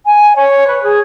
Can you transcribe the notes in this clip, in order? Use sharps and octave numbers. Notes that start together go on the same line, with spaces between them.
G#5
C#5
B4
G#4